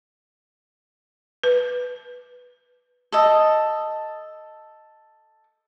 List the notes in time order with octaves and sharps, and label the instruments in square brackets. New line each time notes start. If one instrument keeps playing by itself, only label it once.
[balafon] B4
[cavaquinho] A4 D#5